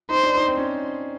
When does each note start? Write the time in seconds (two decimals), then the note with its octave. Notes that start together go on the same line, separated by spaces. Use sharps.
0.10 D#4 C5
0.23 D4
0.36 D#4
0.48 C4
0.57 C#4